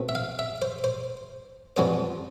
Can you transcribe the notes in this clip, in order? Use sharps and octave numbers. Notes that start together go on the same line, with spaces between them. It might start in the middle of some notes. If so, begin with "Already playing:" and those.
Already playing: B2 A3 C4
E5
F5
E5
C5
C5
F2 E3 G3 B3 C5